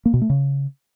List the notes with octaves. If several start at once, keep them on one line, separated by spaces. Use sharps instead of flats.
A#3
B2
A3
C#3